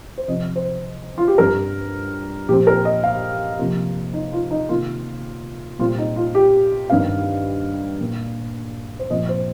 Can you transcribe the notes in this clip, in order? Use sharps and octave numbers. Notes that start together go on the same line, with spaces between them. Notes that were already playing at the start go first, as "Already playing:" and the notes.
C5
C3 F3 C4 D#5
C5
F4
G4
G2 G3 C4 A#4
A#2 F3 C4 G4
A#4
D#5
F5
C3 F3 A#3
D#4
F4
D#4
C3 D#3 A#3 F4
A#2 G3 C4 F4
D#4
F4
G4
G2 D#3 C4 F5
A#2 A#3
C5
A#2 F3 C4 D#5
C5